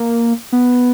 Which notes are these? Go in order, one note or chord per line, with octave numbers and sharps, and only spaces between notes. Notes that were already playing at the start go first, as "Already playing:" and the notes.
Already playing: A#3
B3